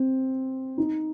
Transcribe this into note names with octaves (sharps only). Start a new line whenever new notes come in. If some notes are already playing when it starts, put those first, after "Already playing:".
Already playing: C4
D#4